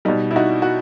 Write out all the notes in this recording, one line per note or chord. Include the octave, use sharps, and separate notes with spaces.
B2 G3 D#4
E4
D#4 F#4
F#4